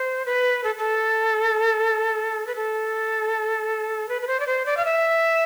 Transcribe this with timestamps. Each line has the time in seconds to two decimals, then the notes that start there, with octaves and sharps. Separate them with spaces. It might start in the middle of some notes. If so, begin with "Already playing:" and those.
Already playing: C5
0.26 B4
0.64 A4
0.79 A4
2.47 B4
2.56 A4
4.09 B4
4.22 B4
4.27 C5
4.40 D5
4.47 C5
4.66 D5
4.77 F5
4.85 E5